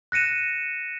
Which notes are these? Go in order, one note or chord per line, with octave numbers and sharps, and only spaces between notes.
F#6 A#6 C#7 D#7 E7